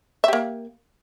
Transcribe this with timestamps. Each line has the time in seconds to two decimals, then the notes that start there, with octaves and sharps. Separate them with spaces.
0.24 E5
0.28 G4
0.33 A#3